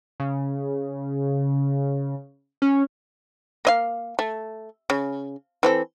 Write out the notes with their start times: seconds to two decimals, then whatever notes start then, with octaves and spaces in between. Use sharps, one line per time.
0.20 C#3
2.62 C#4
3.65 A#3 D#5 F5
4.19 A3
4.90 C#3
5.63 E3 C4 A4